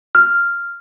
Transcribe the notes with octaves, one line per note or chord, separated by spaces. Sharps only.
F6